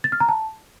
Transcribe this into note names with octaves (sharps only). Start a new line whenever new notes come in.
A6
F6
A#5
A5